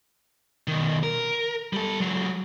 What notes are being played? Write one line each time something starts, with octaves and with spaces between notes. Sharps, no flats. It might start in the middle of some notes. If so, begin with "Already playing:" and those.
B2 D#3
A#4
G3 A4
F#3 G#3